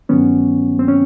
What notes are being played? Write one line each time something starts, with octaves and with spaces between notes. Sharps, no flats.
G2 D#3 F#3 B3 C#4
C4
C#4